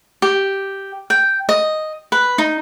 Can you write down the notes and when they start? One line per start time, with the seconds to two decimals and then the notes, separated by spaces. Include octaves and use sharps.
0.22 G4
1.10 G5
1.49 D#5
2.12 B4
2.38 D#4